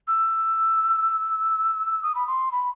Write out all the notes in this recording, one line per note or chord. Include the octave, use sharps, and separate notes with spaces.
E6
D#6
B5
C6
B5